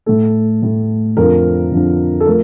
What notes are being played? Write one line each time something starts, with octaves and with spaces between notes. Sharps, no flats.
A2 A3 A4
A2 A3
F2 D3 F3 A#4
F2 D3 F3
A4
F3 A3 A#4